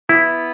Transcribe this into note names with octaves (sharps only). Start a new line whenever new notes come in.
B3 E4